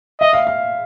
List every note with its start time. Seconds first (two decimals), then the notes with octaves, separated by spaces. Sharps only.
0.20 D#5 E5
0.33 F5
0.47 F5